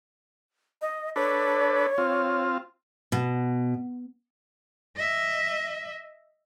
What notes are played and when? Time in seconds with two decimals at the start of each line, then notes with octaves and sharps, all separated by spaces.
0.82 D#5
1.16 D4 A4 B4 C#5
1.98 C4 F4
3.12 B2
4.96 D#5 E5